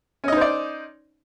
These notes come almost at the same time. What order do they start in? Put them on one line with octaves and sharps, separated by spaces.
C#4 D#5 D#4 C5 D5